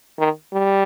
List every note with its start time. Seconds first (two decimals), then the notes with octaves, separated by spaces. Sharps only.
0.19 D#3
0.53 G3